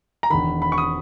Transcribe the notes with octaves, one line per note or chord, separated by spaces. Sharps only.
A#5
E1 E2 D#3 B5
B5
C#6
D#6